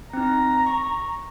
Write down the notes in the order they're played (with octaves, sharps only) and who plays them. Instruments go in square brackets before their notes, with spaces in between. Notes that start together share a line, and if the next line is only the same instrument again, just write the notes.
[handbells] C4 D#4 [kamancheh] A#5
[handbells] C#6